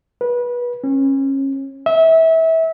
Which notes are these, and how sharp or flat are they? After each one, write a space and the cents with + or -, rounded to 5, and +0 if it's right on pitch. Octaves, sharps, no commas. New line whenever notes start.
B4 -25
C#4 -30
E5 -25